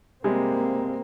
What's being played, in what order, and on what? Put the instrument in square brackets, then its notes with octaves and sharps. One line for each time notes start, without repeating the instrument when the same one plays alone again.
[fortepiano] C3 G3 G#3 [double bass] A#3 C4